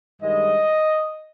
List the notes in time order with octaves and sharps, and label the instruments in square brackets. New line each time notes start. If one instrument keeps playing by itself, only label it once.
[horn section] G2 D#3 G#3 D#5